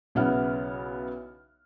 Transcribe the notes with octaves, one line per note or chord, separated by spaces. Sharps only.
B1 C#3 B3 E4 F#5 F6